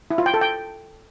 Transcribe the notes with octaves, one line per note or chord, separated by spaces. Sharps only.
E4
F4
G5
A4
G5